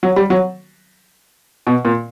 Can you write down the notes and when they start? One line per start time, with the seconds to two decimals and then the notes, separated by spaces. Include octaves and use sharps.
0.03 F#3
0.16 G3
0.30 F#3
1.67 B2
1.85 A#2